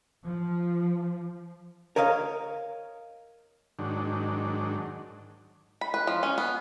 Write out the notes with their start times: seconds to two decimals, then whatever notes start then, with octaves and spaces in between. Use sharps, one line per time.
0.24 F3
1.96 A#4 C#5 D#5 F5
3.79 G#2 D#3 F#3 D4
5.81 B5
5.94 B4
6.07 F3
6.23 C#4
6.38 B3